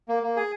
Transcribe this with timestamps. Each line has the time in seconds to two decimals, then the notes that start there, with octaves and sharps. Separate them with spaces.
0.09 A#3
0.23 A#3
0.37 G#4